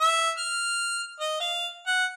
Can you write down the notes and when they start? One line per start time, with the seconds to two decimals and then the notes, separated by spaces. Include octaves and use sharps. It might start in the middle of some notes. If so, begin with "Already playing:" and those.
0.01 E5
0.38 F6
1.20 D#5
1.40 F5
1.87 F#5